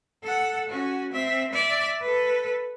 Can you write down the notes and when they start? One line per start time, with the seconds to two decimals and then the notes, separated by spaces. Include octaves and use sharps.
0.23 A4 F#5
0.69 C#4 F#4
1.12 C4 E5
1.53 D5 E5
2.01 A4 B4